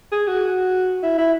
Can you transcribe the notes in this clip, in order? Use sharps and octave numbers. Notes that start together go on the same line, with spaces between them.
G#4
F#4
E4
E4